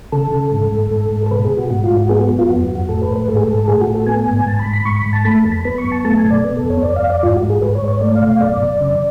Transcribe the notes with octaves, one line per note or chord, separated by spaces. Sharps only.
C#3 A4
C#3
G#2
G#2
G#2
G#2
A4
B2 B4
G#4
B2
F#4
G#2 F#4
F4
G#2
F#4
B3 G#4
F#4
F#2
F4
F2 F#4
F2
F#4
A2 A4
B4
A2
B4
G#2 A4
G#4
G#2 A4
A2 G#4
F#4
A2
A4
B3 G#5
G#2
G#2 A5
B5
G#2
B5
G#2 C#6
B5
G#2
A5
A3 B5
A5
F2
B5
B3 B5
C#6
F#2
A5
A3 A5
G#5
B2
D5
B3
A4
F2
C#5
F2 D5
F5
F2
D5
G#2 F4
F#4
G#2
G#4
G#2 B4
C#5
G#2
C#5
A3 D5
F5
B2
F5
F#2 D5
F#2
C#3